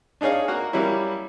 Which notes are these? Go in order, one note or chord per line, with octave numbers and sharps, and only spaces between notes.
D4 D#4 G#4 C#5 F5
A#3 F#4 A#4
F#3 G3 A#3 C#4 E4